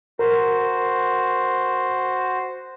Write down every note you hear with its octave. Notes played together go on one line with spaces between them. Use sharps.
F#4 A#4 C5